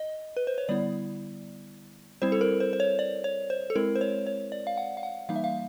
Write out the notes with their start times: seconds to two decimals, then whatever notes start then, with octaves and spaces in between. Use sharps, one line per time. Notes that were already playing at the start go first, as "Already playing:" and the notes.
Already playing: D#5
0.37 B4
0.47 C5
0.58 C#5
0.68 D3 G3 B3 E4 D5
2.22 G3 C4 E4 C5
2.32 A4
2.41 A#4
2.60 C5
2.73 C5
2.80 C#5
2.99 D5
3.24 C#5
3.50 C5
3.70 A4
3.75 G#3 C4 E4 A#4
3.95 C5
4.01 C#5
4.27 C#5
4.52 D5
4.67 F5
4.77 F#5
4.97 F5
5.03 F#5
5.29 E3 G3 A#3 D#4 F5
5.36 E5
5.44 F5